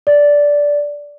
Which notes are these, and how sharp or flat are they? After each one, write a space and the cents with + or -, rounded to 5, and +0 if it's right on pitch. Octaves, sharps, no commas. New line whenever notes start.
D5 -10